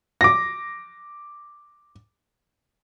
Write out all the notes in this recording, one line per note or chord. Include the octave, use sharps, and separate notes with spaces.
D6 A#6